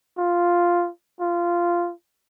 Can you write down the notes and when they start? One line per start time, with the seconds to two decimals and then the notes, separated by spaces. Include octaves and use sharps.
0.18 F4
1.21 F4